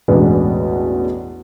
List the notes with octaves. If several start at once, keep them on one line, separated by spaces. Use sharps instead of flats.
A1 E2 B2 G#3 D4 B4